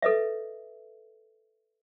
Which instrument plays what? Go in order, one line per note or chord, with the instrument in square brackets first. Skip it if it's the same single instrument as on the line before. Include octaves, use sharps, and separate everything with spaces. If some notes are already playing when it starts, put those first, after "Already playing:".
[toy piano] A4 B4 D#5 E5